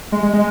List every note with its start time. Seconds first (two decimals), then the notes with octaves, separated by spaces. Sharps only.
0.12 G#3
0.23 G#3
0.33 G#3